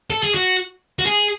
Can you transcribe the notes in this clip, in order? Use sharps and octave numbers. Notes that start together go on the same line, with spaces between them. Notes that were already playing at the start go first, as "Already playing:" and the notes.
A4
G#4
F#4
F#4
G#4